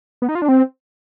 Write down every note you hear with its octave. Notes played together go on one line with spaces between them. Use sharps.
B3
D#4
F4
D4
C4